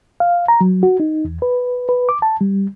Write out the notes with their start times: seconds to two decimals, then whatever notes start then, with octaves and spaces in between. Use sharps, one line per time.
0.20 F5
0.48 A#5
0.61 F#3
0.83 F#4
1.00 D#4
1.25 E2
1.42 B4
1.89 B4
2.09 D6
2.22 A5
2.41 G3